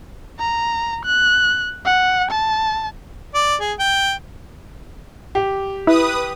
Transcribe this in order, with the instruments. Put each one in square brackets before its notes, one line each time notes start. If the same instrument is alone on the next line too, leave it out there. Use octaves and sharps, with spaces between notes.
[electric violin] A#5
F#6
F#5
A5
[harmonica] D5
G#4
G5
[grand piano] G4
[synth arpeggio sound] E4 [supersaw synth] B4 D#6